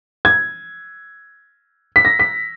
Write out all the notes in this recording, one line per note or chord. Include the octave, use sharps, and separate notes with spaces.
G#6
B6
A#6
B6